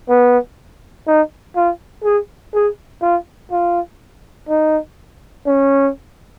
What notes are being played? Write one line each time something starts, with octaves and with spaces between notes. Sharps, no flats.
B3
D#4
F4
G#4
G#4
F4
F4
D#4
C#4